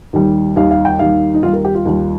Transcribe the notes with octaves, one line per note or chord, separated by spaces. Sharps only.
D#2 D#3 G3
D#2 D#3 G3 F5
F5
G5
D#2 D#3 G3 F5
D#4
D#2 D#3 G3 F4
A#4
G4
F4
D#2 D#3 G3